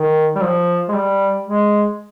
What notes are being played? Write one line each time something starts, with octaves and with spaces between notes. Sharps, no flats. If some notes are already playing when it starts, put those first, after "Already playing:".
Already playing: D#3
G3
F3
G#3
G3
G#3